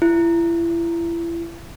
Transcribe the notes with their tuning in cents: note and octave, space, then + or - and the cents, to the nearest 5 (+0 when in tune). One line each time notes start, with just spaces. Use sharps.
E4 +35